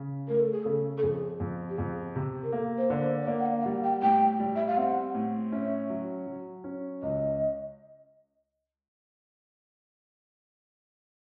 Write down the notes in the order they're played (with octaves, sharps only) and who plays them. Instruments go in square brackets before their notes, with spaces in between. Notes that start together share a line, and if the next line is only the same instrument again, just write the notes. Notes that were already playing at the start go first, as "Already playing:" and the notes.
Already playing: [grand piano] C#3
[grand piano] A3 [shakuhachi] A#4
[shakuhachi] A4
G#4
[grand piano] C#3 [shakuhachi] A4
[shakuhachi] A4
[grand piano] F2 [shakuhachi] G#4
[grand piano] F2
[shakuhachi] G4
[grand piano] F2 [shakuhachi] G#4
[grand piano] C3
[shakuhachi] A#4
[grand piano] A#3 [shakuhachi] A4
[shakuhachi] C5
[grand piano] D3
[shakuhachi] C5
C#5
[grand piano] A#3 [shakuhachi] D5
[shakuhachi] F#5
F5
F5
[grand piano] G3 [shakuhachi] F#5
[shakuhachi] G5
[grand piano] A2 [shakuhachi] G5
[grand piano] G3
[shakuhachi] E5
F5
[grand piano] C4 [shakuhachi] F#5
[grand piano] A2
[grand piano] C#4 [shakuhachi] E5
[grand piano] F#3
F#3
C#4
[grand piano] C#2 [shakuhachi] D#5